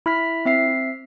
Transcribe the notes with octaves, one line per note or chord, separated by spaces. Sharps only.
E4 B5 F6 B6
C4 E5 C7